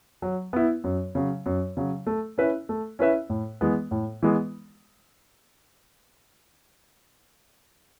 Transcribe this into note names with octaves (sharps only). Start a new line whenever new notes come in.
F#3
B3 E4
F#2
C#3 F#3
F#2
C#3 F#3
A3
C#4 E4 B4 E5
A3
C#4 E4 B4 E5
A2
E3 G#3 B3
A2
E3 G#3 B3